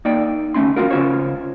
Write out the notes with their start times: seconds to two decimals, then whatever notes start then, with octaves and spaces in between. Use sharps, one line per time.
0.05 A#3 D#4 D5 G5
0.54 D2 A3 C#4 C6
0.76 F2 E3 C4 F4 F#4 A#4
0.91 C#3 C#4 F4 C5 C#5